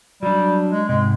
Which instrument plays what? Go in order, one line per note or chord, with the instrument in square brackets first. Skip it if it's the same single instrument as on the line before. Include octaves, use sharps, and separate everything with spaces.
[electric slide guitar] F#3 D4 [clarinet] G3
[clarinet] G#3
[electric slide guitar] G#2 C3 [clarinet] G#3